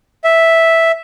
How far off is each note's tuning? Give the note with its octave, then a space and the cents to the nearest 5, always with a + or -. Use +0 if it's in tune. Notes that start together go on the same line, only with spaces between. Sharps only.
E5 -5